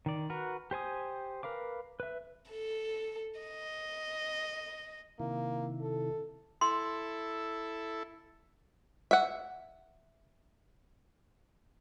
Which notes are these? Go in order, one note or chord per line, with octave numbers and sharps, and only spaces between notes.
D#3 D5
F#4 A#4 B4
G4 C5 G#5 D#6
A#4 B4 F5 D6
B4 E5
A4
D#5
C3 D#3 A#3 E4
A4
E4 A4 C6
E5 F#5